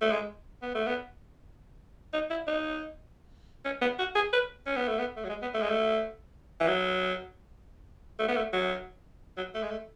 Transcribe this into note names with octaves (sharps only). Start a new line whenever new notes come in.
A3
G#3
B3
A3
B3
D#4
E4
D#4
C#4
B3
F#4
G#4
B4
C#4
B3
A3
B3
A3
F#3
G#3
B3
A3
G#3
A3
E3
F#3
A3
B3
A3
F#3
F#3
A3
G#3
A3